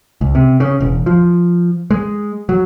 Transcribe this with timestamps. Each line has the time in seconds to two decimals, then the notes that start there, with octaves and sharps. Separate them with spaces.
0.21 C#2
0.35 C3
0.60 C#3
0.80 E1
1.06 F3
1.91 G#3
2.49 F#3